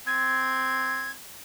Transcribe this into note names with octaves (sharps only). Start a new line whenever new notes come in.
C4 G#6